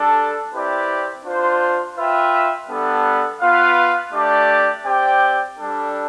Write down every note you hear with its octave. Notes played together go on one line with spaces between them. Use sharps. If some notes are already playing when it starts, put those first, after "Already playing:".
Already playing: G3 D4 A4
C4 E4 G4 B4 D5
D4 F4 C5
F4 B4 E5 G5
G3 B3 D4 A4
B3 F4 B4 F5
A3 D4 G4 D5
C4 G4 D5 G5
G3 D4 A4